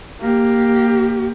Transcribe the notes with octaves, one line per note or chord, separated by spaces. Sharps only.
A#3 G4